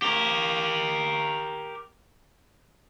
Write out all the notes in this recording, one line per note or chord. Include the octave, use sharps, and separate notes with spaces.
G4 A#4